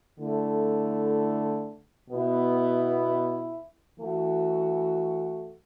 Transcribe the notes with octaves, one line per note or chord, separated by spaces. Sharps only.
D3 A3 E4 A4
B2 B3 E4
E3 A3 F#4